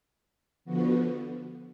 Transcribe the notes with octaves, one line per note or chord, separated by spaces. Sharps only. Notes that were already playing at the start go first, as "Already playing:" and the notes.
D3 F3 B3 F#4